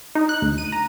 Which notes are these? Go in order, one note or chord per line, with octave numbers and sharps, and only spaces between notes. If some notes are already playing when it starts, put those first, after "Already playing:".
D#4
F#6
D2
D#7
A#5